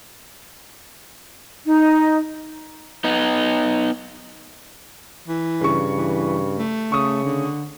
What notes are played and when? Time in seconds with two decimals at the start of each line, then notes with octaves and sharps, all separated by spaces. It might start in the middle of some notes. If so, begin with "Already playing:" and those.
1.66 D#4
3.04 B3 D#4
5.28 E3
5.61 G2 C#3 C#6
5.96 E3
6.58 A3
6.92 C#3 C#6 D#6
7.24 D3